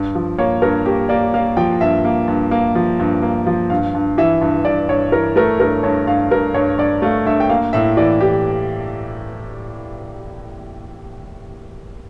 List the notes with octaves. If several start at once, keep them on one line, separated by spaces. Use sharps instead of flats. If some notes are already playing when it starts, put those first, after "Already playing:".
Already playing: G2
F3
A#3 C#5
G2 A#4
A#3 G4
A#3 D5
A#3 F5
F3 G5
G2 E5
A#3
G2
A#3
F3
G2
A#3
F3
G2 F5
G2
E3 E5
G2
G2 D5
G2 C#5
E3 A#4
A3 A#4
G2 A#4
G2 C#5
G2 F5
G2 A#4
G2 C#5
G2 D5
A3 F5
G2 E5
G5
A#3 F5
A2 E5
E3 D5
E3 G4